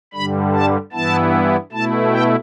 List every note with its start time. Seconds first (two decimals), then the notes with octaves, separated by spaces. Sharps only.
0.13 G2 D3 G3 B5
0.54 A5
0.92 G2 E3 B3 E4 A5
1.72 B2 A3 E4 A5
2.12 G5